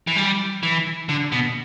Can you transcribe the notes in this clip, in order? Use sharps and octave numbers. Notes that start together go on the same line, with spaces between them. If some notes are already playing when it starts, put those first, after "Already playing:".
E3
G3
E3
D3
B2